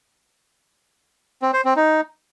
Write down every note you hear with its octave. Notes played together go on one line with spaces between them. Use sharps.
C4
C5
C4
D#4